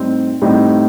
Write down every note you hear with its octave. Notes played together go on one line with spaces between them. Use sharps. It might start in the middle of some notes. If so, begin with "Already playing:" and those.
Already playing: A2 G3 C4 D#4 G4
A2 G3 C4 D#4 G4